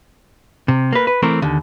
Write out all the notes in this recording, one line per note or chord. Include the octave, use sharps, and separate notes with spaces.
C3
A#3 B4
B4
E3 A3 C4 A#4
D#2 D3